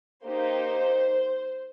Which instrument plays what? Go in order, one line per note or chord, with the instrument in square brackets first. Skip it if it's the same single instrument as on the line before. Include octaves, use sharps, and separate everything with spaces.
[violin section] A#3 D#4 G4 C5